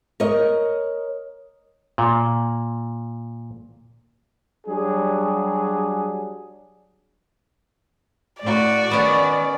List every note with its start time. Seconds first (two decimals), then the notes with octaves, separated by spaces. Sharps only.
0.20 A#4 C#5 D#5
1.98 A#2
4.67 F#3 G3 D4 G#4
8.42 A2 F#4 D5
8.91 D#3 B3 C#4